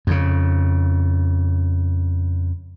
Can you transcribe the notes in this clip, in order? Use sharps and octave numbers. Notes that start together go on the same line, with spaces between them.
F2 C#3